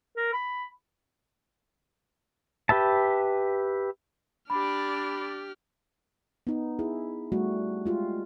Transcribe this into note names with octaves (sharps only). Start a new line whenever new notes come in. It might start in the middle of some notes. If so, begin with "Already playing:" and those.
A#4
B5
G4 B4 E5 A5
D4 G4 D5 B5 F6
B3 D#4
E4 G#4
G3 A3 F#4
G#3 F4 G4